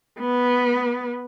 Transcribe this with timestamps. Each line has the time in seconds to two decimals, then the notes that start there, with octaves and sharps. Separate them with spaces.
0.20 B3